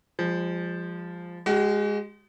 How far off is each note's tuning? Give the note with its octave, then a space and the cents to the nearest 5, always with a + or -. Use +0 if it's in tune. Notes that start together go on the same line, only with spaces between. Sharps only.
F3 +0 G#3 -40
G#3 -5 F#4 +45